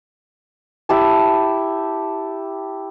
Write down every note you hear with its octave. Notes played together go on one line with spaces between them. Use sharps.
E4 G4 A5